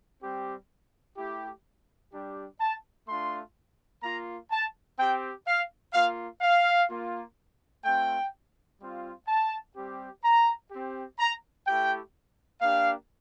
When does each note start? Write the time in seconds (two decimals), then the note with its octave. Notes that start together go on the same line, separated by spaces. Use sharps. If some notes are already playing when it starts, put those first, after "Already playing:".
0.22 G3 C4 G4
1.17 A3 E4 G4
2.12 G3 D4 G4
2.60 A5
3.07 A3 D4 F4 C6
4.03 A#3 F4 A#5
4.51 A5
4.98 C4 G4 G5
5.46 F5
5.93 A#3 F4 F5
6.41 F5
6.89 A#3 F4
7.84 A3 C4 F4 G5
8.80 G3 C4 F4
9.27 A5
9.75 G3 C4 G4
10.23 A#5
10.71 C4 G4
11.19 A#5
11.66 A3 E4 G4 G5
12.61 A#3 D4 G4 F5